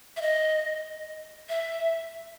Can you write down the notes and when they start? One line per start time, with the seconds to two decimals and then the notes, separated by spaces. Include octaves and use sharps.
0.17 E5
0.22 D#5
1.49 E5